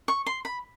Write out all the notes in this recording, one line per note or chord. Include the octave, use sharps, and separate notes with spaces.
C#6
C6
B5